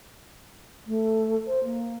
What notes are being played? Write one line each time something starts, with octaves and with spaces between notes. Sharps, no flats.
A3
C5
A#3